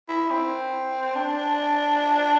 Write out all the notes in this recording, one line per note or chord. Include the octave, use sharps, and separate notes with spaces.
E4
C4
D4